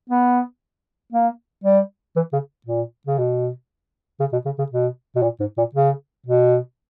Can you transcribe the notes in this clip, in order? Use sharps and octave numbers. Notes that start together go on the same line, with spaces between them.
B3
A#3
G3
E3
C#3
A#2
C#3
B2
C#3
B2
C#3
C#3
B2
B2
A#2
G#2
A#2
C#3
B2